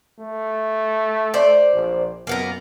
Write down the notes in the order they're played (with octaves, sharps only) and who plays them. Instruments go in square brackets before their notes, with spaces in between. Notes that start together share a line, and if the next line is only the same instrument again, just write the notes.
[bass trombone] A3
[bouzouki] C5 D5
[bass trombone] A#1
[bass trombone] F#2 [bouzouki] A#3 B3 A#4